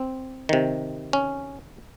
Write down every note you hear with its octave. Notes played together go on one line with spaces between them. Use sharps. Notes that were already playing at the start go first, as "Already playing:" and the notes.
Already playing: C4
C3 D#3
C#4